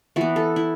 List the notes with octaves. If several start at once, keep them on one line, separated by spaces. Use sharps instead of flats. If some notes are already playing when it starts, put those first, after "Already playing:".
E3 B3 F#4
A4
E4